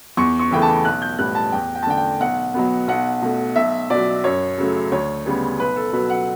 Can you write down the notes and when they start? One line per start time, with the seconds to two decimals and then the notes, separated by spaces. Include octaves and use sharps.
0.17 E2 C#6
0.39 C#6
0.51 C#3 E3 A3 G5
0.62 A5
0.85 B1 F#6
1.02 G6
1.19 A2 G3 B3 F#6
1.35 A5
1.52 E2 G5
1.75 G5
1.83 A5
1.87 D3 A3 G5
1.98 G5
2.20 B1 F#5
2.54 B2 F#3 B3
2.88 B1 F#5
3.22 B2 A3
3.55 B1 E5
3.90 B2 F#3 D5
4.24 F#2 C#5
4.58 C#3 F#3 A3
4.92 D2 C#5
5.26 C#3 G3 B3
5.59 B1 B4
5.76 A4
5.93 B2 F#3 B4
6.10 F#5